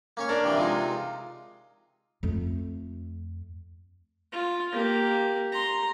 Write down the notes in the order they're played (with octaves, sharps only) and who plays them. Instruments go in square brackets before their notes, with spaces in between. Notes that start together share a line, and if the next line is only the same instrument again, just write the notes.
[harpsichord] A#3 C#4 C#5
[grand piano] D4 A#4
[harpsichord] C3 E3 F3
[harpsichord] C3 G#3 D#4 [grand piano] F4
[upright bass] F2 A3
[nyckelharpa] F4
A#3 G4
A#5 C6